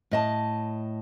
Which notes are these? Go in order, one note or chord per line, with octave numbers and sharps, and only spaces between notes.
A2 D#5 A5